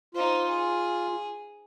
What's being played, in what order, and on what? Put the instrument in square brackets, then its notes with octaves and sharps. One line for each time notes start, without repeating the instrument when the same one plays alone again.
[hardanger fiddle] D#4 C5 [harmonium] F4
[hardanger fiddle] G#4